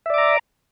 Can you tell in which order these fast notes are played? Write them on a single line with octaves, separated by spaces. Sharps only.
E5 D5 D6 A#5